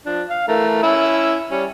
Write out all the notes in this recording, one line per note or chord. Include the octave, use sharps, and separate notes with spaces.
F3 D4
F5
E3 A3 A#4
C#4 E4 E6
G3 C#4